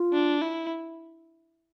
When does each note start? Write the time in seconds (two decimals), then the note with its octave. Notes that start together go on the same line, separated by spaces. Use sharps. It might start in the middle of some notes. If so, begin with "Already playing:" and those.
Already playing: F4
0.13 D4
0.42 E4